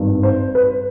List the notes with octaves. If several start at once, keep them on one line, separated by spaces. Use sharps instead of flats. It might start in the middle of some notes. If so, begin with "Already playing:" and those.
Already playing: G#1 G2 D#3
C5
B4